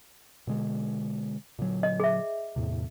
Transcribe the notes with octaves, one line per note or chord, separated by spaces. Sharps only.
B2 D3 G#3
A#2 D3 F#3
D#5
G#4 E5
E2 A2 C3